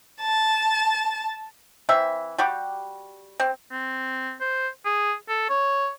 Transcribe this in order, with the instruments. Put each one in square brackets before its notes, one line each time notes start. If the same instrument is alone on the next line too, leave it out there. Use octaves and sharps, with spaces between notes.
[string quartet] A5
[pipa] E3 C4 E5
G3 F#4 G4
C4
[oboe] C4
C5
G#4
A4
C#5